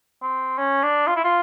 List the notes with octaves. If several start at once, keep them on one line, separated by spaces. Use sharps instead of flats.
C4
C#4
D4
F4
E4
F4